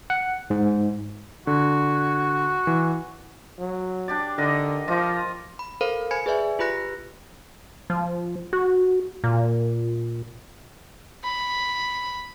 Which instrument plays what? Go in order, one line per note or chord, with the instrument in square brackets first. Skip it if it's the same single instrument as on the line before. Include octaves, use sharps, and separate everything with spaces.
[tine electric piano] F#5
G#2
[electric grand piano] D3 [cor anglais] F#4
[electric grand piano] E3
[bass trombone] F#3
[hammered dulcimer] D4 G4 D5
[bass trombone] D3 [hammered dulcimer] D#4 A#4 D#5
[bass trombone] F3 [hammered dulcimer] F4 D#5 D6
[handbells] B5
A4 A#4 C5 F5 B5
C5 G#5 B5 G#6 C#7
G#4 B4 D5 E5 G#5
F4 G4 B4 B5 F#6 A#6
[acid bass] F3
F#4
A#2
[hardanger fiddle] B5